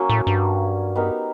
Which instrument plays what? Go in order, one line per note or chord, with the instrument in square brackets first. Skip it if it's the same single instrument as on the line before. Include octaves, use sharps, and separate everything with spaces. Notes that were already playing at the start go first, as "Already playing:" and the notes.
Already playing: [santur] F#3 A#3 C#4
[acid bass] A2
G2
[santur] B3 D#4 G4 A#4